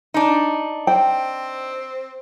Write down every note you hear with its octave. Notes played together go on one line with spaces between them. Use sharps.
D4 D#4
C4 G5